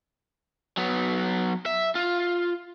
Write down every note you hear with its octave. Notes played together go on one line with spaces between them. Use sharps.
F#3 B3
E5
F4